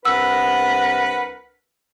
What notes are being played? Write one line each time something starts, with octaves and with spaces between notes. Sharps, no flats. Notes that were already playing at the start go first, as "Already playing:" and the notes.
C2 D4 A#4 B4 F#5 E6